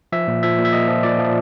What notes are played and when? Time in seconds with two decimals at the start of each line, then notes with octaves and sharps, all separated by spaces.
0.12 F3 E5
0.27 A#2
0.43 F3 E5
0.58 A#2
0.65 E5
0.73 A#2 D#5
0.88 F3
1.03 A#2 D5
1.19 F3